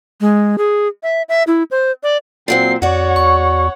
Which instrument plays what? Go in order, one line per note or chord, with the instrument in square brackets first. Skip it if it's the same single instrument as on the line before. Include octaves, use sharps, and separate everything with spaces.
[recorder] G#3
G#4
E5
E5
E4
C5
D5
[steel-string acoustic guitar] A#2 F#3 C4 [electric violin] G5 C7
[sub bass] F2 [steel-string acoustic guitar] F#4 D5 [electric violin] C#5 F#5
[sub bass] E2 [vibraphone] C#6